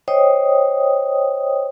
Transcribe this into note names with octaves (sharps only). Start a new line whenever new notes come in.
C5 C#5 D#5 G5 D#6